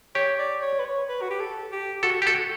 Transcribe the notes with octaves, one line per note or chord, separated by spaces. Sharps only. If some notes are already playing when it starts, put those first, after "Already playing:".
G4 C#5
D5
C#5
B4
C#5
B4
F#4
G4
A4
G4
F#4 A4
G4
F#4 A4